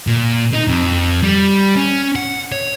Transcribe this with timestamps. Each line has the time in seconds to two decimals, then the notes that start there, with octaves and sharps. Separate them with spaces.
0.07 A#2
0.53 D#4
0.68 F2
1.23 G3
1.76 C#4
2.16 F#5
2.52 C#5